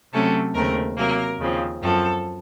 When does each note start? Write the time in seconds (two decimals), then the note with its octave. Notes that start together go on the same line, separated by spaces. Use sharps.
0.13 C3 F#3 A3 C#4 A4
0.54 D#2 C#3 A3 C4 A#4
0.97 C3 F#3 A#3 A#4
1.39 D#2 C#3 F3 C4
1.81 F#2 F3 C4 A4